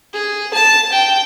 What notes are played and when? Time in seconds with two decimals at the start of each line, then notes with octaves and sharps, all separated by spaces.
0.13 G#4
0.54 A5
0.92 G5